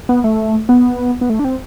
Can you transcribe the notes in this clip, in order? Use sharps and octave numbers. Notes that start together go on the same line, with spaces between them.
B3
A3
B3
B3
A3
D4
C4